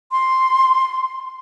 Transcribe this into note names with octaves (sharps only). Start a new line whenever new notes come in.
C6